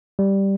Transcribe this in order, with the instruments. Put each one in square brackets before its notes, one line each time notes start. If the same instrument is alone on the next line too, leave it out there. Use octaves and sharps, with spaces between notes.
[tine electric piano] G3